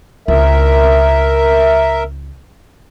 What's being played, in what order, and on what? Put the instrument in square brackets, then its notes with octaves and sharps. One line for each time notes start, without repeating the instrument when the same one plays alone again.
[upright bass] C#2 [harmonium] A#4 E5